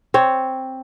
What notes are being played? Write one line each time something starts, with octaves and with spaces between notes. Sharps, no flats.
C4 C#5